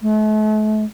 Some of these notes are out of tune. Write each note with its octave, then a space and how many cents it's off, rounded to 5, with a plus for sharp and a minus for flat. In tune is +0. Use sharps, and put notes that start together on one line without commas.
A3 -40